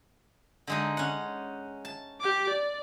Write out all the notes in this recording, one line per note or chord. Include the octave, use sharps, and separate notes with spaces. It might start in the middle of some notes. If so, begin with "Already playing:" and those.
D3 G#3 D#4
C#4 F#5
A5
G4 D6
D5